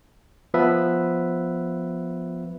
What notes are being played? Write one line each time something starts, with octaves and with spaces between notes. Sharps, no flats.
F3 B3 B4 E5